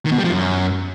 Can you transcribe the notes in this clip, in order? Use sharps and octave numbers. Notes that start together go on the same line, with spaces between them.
D#3
B2
G3
F3
F#2